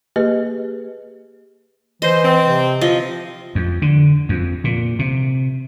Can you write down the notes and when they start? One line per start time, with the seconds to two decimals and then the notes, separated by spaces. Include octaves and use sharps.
0.16 A#3 G4 G#4 B4 D#5
2.02 E3 C5 D#5
2.24 C4
2.44 C3
2.81 F3 D#5
3.55 F2
3.82 D3
4.29 F2
4.64 A#2
4.99 C3